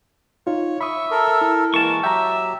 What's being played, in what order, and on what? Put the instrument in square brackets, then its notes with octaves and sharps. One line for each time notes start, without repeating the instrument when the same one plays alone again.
[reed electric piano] D#4 F4 [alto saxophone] C#5
[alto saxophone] E5 [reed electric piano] B5 D#6 [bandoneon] C#6
[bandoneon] A4 A#4
[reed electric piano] E4
[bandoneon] E3 G#3 A#3 [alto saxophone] A#4 [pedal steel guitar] A5 C#6
[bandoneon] F#3 G4 [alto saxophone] E5 [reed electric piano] G5 A#5